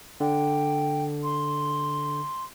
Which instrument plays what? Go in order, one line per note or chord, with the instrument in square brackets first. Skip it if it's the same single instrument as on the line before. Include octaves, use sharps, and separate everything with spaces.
[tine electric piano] D3 [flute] G5
[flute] C6